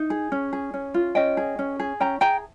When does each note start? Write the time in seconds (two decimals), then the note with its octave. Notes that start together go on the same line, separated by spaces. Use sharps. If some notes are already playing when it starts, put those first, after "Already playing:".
Already playing: D#4
0.10 G#4
0.32 C#4
0.53 G#4
0.74 C#4
0.94 F4
1.15 C#4 D#5 G5
1.37 G#4
1.59 C#4
1.80 G#4
2.00 C#4 G5 A#5
2.21 G#4 G5 A#5